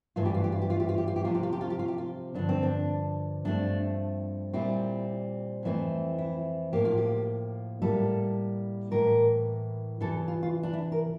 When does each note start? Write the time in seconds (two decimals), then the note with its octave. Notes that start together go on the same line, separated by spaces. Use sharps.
0.16 G2 E3 A3 C4 F4
0.25 G4
0.34 F4
0.44 G4
0.52 F4
0.62 G4
0.70 F4
0.80 G4
0.89 F4
0.98 G4
1.07 F4
1.16 G4
1.24 C3 F3 C4 F4
1.35 G4
1.43 F4
1.53 G4
1.61 F4
1.70 G4
1.79 F4
1.88 G4
1.98 F4
2.34 G2 D3 F3 D4
2.49 C4
2.63 D4
3.45 G2 F3 A3 C4 D4
4.53 A#2 G3 C4 E4
5.63 F2 E3 A3 C4
6.18 E4
6.73 A2 F3 A#3 G4
6.85 F4
6.97 G4
7.82 A2 G3 A#3 A4
8.91 A2 E3 A#3 A#4
10.01 E2 C3 E3 A4
10.28 F4
10.43 F4
10.63 D4
10.73 E4
10.92 A#4